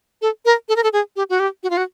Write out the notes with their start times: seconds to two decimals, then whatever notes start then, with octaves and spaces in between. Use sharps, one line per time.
0.22 A4
0.45 A#4
0.69 A4
0.76 A#4
0.84 A4
0.93 G#4
1.16 G4
1.30 F#4
1.40 G4
1.63 F#4
1.70 F4
1.77 F#4